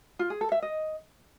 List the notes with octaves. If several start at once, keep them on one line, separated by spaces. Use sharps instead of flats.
F4
G#4
A4
E5
D#5